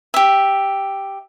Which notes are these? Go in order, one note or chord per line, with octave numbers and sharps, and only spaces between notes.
G4 E5